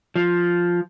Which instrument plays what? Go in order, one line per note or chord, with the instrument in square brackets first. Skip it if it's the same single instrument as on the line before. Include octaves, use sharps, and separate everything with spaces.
[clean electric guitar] F3